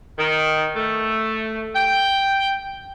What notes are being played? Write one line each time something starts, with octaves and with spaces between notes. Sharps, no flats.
D#3
A3
G5